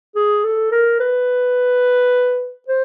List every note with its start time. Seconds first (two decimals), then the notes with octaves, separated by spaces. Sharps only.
0.16 G#4
0.44 A4
0.72 A#4
1.00 B4
2.68 C5